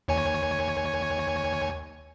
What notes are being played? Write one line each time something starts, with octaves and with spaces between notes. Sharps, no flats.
D#2 C#5 G#5